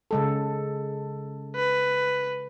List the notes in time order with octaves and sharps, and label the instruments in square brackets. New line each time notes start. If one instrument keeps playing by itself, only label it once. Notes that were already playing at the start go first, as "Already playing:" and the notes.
[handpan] C#3 G#3 A4
[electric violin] B4